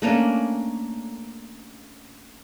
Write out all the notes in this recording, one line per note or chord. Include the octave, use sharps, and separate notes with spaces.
A3 A#3 C#4 D4